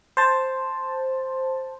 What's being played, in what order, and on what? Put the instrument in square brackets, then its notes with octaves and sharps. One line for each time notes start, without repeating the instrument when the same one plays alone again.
[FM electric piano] C5 A5